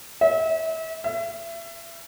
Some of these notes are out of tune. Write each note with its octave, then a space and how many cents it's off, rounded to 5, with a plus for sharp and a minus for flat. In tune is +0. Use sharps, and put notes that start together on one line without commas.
E5 -35
E5 +30